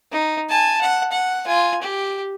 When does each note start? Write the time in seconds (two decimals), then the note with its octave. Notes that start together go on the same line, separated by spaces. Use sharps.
0.12 D#4
0.49 G#5 A5
0.81 F#5
1.12 F#5
1.47 F4 G#5
1.82 G4